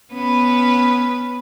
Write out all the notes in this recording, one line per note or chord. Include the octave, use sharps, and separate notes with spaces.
B3 C#4 B4